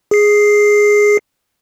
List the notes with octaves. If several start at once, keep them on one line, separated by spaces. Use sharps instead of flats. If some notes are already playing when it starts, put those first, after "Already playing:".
G#4 C7